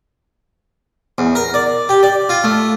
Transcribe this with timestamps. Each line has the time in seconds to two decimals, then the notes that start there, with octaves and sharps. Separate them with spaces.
1.18 E2
1.35 A#4
1.54 D5
1.89 G4
2.03 D5
2.29 F4
2.44 A3